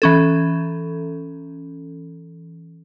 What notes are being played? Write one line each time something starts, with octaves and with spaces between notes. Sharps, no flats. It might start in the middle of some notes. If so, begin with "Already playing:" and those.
E3 C#4 A4